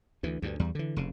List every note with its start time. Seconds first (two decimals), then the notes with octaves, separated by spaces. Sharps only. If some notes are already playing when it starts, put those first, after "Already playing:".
0.23 D2 E3
0.42 D2 G2
0.60 E2 G3
0.75 D3 E3
0.96 F1 C#3